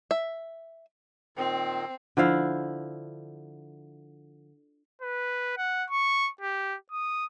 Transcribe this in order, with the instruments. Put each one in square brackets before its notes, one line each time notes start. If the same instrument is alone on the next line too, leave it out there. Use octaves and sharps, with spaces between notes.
[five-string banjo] E5
[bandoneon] A#2 D#3 [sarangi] C4
[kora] D3 F3 E4 F5
[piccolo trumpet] B4
F#5
C#6
G4
D#6